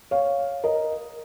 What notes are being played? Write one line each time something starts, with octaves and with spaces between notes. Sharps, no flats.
C#5 F5
A#4 D#5